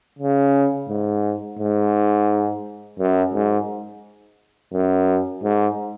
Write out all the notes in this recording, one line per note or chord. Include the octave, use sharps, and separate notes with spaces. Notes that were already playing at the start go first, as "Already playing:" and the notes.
C#3
G#2
G#2
F#2
G#2
F#2
G#2